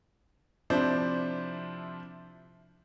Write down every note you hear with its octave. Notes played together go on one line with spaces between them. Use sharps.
C3 F3 D4 E4 C5